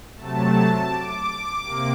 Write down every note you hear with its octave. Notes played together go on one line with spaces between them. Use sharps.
C3 F#3 A3 A5
D6
C3 A#3